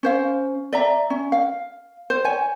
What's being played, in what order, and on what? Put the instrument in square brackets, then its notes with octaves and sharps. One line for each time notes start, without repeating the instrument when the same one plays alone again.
[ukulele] C#4 C5 F5
D5 E5 A#5
C#4
F5
C5
C#5 G#5